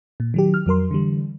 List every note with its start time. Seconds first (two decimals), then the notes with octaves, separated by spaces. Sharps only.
0.20 A#2
0.34 D#3 F#3 G4
0.54 F6
0.66 F2 F#3 A#4 C6
0.91 D3 E3 G3